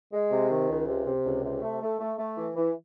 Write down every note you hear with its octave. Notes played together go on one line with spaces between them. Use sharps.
G#3
C3
D#3
C#2
C3
C3
C#2
C3
A3
A3
A3
A3
E3
E3